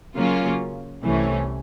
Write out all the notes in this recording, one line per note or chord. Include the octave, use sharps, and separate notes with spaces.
C#3 F#3 A#3 C#4 F4
C2 C3 E3 A3 C#4